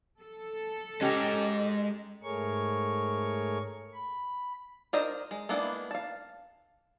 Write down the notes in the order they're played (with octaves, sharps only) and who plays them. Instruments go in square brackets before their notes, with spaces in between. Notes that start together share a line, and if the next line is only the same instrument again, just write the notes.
[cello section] A4
[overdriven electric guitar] G#3 A#5 [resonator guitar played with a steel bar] C#4 G4 [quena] D#5
[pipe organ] G#2 A3 G#4 A#4 C#5 C#6
B5
[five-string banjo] D4 A#4 C5 D#5
G#3
G#3 A#3 B3 D4 E4
F5 A5